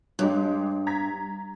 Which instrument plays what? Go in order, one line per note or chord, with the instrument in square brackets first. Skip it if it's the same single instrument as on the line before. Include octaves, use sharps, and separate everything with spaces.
[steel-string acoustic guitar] G2 [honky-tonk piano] G#3 G4 C#5
[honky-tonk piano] A#5 G#6 B6